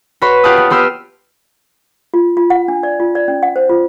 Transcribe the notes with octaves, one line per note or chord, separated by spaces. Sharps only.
F#4 B4 C#5 B5 C6
F4 G4 F5 F#5 A5 D#6
B3
B3 G4 C6 E6 F6 D#7
F4
F4
F#5
D4
D5
F4
D5
C#4
F#5
C5
F4